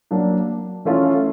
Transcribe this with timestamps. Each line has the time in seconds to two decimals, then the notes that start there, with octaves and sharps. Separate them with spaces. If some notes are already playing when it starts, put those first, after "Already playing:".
0.11 F#3 A#3 D4
0.85 E3 A3 C#4 F4 A4